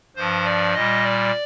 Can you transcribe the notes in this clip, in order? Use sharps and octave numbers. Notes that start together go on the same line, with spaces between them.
G2 F3 C5
D5
A#2 G3 D#5
D5